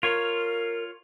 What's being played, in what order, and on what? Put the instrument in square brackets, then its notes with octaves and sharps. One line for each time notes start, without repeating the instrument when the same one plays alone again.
[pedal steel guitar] F4 C#5 [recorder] A#4